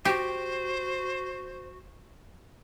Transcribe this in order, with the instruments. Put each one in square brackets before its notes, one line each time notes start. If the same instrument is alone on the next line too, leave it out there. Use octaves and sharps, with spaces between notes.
[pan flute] F#4 [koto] G4 [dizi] C5